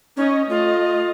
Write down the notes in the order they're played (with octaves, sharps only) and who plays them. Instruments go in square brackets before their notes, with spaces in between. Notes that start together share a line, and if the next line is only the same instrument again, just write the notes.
[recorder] C#4 [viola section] D#4 C#5 D#5
[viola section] A3 D#5 [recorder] F4